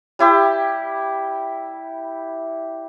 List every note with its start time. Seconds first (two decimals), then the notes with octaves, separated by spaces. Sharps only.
0.19 G3 E4 G4